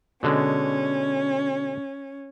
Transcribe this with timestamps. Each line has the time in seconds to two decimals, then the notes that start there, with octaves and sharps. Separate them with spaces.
0.23 B2 D3 G#3 C#4